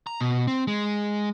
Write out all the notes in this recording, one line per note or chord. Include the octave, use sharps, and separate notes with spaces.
A#5
B2
C4
G#3